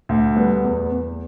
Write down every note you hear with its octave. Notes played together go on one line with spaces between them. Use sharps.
D2
G3 B3
E2
E2